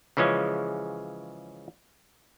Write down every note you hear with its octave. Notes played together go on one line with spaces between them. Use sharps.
C#3 E3 F3 G#3 C#4